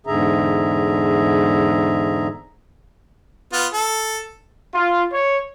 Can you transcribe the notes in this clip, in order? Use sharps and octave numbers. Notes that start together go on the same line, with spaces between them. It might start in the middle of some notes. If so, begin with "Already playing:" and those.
E2 G#2 D3 G#4 E5 A#5
B3 F4
A4
F4
C#5